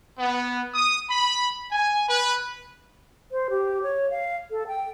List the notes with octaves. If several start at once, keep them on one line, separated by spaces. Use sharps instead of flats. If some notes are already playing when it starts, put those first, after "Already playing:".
B3
D#6
B5
G#5
B4
C5
G4
C#5
F5
A4
G5